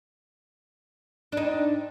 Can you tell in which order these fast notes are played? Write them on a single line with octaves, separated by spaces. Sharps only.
D4 D#4 C4